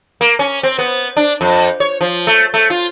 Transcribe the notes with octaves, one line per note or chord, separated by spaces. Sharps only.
A#3
C#4
C4
B3
D4
F2
C#5
F3
A3
A3
F4